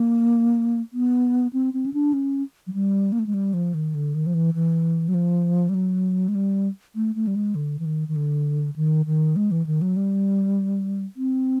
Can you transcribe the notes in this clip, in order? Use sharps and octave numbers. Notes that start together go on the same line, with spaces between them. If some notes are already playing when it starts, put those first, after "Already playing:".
Already playing: A#3
B3
C4
C4
C#4
D4
C#4
F#3
G3
A#3
A3
G#3
G3
F3
D#3
D3
D#3
F3
E3
E3
F#3
F3
G3
F#3
G#3
G3
A3
A3
G3
G#3
D3
E3
D#3
D#3
D3
D#3
D#3
G#3
E3
D#3
F#3
G3
C4